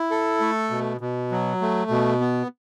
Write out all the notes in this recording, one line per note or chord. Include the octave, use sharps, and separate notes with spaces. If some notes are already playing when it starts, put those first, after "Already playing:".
Already playing: E4
A4
A3
B2
B2
F#3
A3
B2
B3